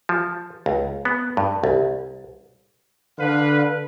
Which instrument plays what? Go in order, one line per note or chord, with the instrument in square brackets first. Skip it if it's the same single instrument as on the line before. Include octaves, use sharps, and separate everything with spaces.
[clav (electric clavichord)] F3
C#2
B3
G2
C2
[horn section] D3 B4 F5